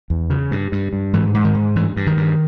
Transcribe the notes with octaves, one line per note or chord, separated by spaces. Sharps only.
E2
C#3
G2
G2
G2
G#2 E3
G#2
D#3
G#2
G2 E3
G2
D#3
G2